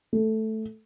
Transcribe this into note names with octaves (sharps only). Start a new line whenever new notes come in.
A3